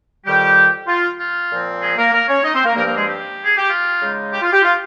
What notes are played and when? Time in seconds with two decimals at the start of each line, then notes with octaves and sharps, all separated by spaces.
0.25 F2 D#3 G3 G4
0.87 F4
1.19 F4
1.51 A#2 F3 C4
1.81 G#3 G#4
1.97 A#3 A#4
2.12 A#3 A#4
2.28 C#4 C#5
2.44 D#4 D#5
2.54 C4 C5
2.65 A#3 A#4
2.75 G2 F3 A#3 C4 A#4
2.86 A#3 A#4
2.96 G#3 G#4
3.07 G4
3.45 G#4
3.57 G4
3.69 F4
4.00 C#3 G#3 D#4
4.32 G4
4.42 F4
4.53 G4
4.62 F4